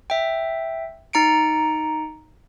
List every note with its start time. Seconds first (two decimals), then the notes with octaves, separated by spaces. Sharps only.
0.10 E5 G5
1.13 D#4 A#5 C#7 D7